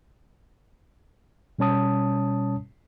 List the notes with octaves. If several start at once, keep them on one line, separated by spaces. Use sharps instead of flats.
B2 G3 C#4 C#5 A5 D#6